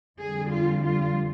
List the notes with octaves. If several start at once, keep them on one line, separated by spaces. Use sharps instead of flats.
F2 D3 G3 G#4
F4
F4